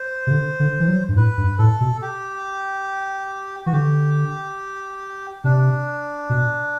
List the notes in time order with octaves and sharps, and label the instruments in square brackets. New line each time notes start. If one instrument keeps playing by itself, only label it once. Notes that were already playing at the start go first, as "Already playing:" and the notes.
Already playing: [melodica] C5
[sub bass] C3
D3
D3
E3
F#3
G2
[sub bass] A2 [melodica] B4
[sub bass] G2
[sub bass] A2 [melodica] A4
[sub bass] B2
[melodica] G4
[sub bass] E3 [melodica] F#4
[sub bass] D3 [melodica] G4
[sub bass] C3 [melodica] D4
[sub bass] B2